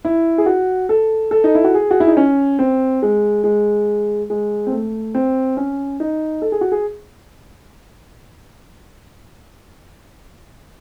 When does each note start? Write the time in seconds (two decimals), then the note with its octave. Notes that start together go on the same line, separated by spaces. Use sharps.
0.05 E4
0.38 G#4
0.46 F#4
0.89 A4
1.31 A4
1.44 D#4
1.55 E4
1.64 F#4
1.74 G#4
1.91 F#4
2.00 E4
2.08 D#4
2.17 C#4
2.59 C4
3.02 G#3
3.44 G#3
4.30 G#3
4.67 C4
4.72 A3
5.15 C4
5.57 C#4
6.00 D#4
6.42 A4
6.52 G#4
6.61 F#4
6.72 G#4